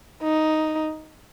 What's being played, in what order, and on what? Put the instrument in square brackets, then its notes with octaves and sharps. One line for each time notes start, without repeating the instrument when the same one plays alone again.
[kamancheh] D#4